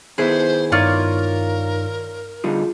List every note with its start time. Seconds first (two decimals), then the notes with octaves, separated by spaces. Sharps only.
0.18 D#3 B3 E4 G#4 C5
0.72 G2 D#4 F4 A#4 C#5 D5 A#5
2.44 D3 G3 D#4 F4 G#4